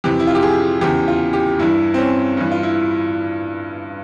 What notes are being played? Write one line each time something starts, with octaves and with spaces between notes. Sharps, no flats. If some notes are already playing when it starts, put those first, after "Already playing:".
F2 C3 E3 G4
E4
F4
G4
G#4
E2 C#3 E3 G4
F4
G4
G2 E3 E4
C4
C#4
G2 E3
F4
E4